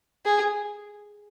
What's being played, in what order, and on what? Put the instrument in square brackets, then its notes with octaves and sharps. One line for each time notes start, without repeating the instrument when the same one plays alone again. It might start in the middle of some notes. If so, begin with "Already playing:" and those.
[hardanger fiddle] G#4